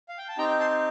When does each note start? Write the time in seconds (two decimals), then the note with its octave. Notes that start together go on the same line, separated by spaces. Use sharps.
0.09 F5
0.18 G5
0.28 A5
0.38 C4 D#4 G4 G5 A#5
0.60 A5 C6